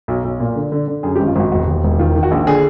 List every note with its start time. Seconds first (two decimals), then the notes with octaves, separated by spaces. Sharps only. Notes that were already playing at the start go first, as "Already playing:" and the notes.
0.08 B1
0.24 B1
0.40 A#2
0.55 D3
0.72 D3
0.88 D3
1.03 F#2 G#4
1.15 G4
1.20 G#1
1.27 F4
1.36 G#1 F#4
1.52 E1 F#4
1.67 D#2
1.84 E1
1.99 D#3 F4
2.15 D#3
2.23 F#4
2.31 A#1
2.47 D3 G#4